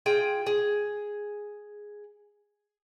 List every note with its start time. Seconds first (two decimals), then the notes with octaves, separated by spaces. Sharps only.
0.06 F4 G#4 G5
0.47 G#4